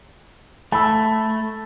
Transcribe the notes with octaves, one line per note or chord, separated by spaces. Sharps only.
A3 A5 B5 E6